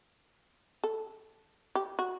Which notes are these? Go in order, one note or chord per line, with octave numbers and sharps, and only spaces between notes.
A4
G4
F#4